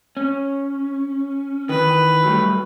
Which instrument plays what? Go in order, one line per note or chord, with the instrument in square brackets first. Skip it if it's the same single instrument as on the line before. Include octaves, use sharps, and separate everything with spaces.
[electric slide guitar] C#4
[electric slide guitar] D#3 E3 [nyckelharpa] B4
[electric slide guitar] F#3 G3 A3